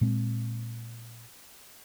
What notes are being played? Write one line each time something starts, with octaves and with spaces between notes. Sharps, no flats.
A#2 G#3 C4